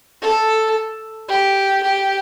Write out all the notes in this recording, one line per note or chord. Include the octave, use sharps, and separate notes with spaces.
A4
G4
G4